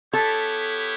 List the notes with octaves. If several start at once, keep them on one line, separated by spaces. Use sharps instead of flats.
B3 E4 G4 A4 C#5